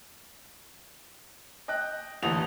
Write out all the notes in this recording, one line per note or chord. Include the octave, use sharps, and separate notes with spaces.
D#5 G5 F#6
A1 D#2 D3 E3 D#6 F7